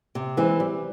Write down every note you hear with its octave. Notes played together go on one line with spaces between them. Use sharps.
C3
E3 G#3 C4
G3